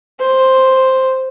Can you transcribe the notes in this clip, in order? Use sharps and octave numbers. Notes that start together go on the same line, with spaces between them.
C5